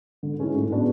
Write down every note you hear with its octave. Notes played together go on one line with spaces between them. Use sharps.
D3
G#3 C#4 E4
A2
G#3 B3 D4 F#4